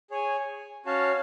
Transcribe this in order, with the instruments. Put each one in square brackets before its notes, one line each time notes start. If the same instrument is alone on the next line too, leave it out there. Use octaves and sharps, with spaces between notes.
[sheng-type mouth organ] G#4 C#5 G#5
C#4 F#4 C#5 F5 A5